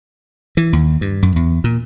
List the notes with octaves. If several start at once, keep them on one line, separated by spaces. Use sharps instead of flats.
E3
D#2
G2
F#2
E2
A#2